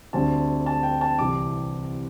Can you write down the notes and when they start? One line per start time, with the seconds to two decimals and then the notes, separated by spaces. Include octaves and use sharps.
0.13 D2 D3 G3 C4 A5
0.66 A5
0.83 G5
1.01 A5
1.18 C2 C3 E3 C4 D6